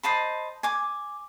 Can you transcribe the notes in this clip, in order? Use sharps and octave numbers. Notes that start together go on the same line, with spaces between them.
C5 D#5 A5 B5
G#5 D6